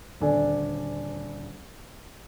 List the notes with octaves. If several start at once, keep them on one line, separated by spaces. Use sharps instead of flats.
D#1 D2 D4 A4 D5 G#5